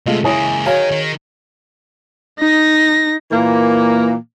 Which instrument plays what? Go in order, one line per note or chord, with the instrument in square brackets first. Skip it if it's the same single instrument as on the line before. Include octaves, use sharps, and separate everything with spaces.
[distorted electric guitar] C3 [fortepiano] G#3 A3 F4
[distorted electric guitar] C#2 A#3 [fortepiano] E4 C#5 [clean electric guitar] G#4
[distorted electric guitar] D#3 [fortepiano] F#4 F5 G#5 [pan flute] C#5
[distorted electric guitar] D#3
[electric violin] D#4 A#6
[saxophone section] A#2 E3 A#3